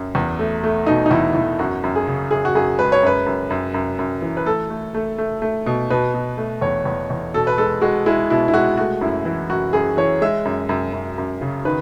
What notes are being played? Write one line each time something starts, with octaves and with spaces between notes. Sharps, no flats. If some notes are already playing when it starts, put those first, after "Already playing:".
Already playing: F#2
E2
A3
A3
B2 D#4
D#4
E2 E4
E2 E4
F#2 F#4
F#2
G#4
C#3
F#2 G#4
F#4
F#2 G#4
G#3 B4
C#5
F#2 B4
F#2
F#2
F#2
F#2
E3
B4
A3 A4
A3
A3
A3
A3
B2
B2 B4
B2
A3
E2 C#5
E2
E2
B2 A4
B4
G#3 A4
G#3 F#4
G#3 E4
B2 E4
E4
G#3 F#4
A3 F#4
F#2 E4
E3 E4
F#2 F#4
F#2 G#4
E3 C#5
G#3 E5
F#2
F#2
F#2
F#2
C#3
D#3 B4